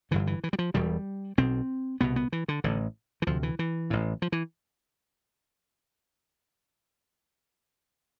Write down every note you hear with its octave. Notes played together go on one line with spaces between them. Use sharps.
G1 G2 D3 E3
E3
E3
G3
F3
E1 E2 B2 G3
B1 B2 C4
C2 B2 B3
B3
E3
D3
A1 A2 D3
E3
D2 C3 F3
E3
E3
A1 A2
F3
E3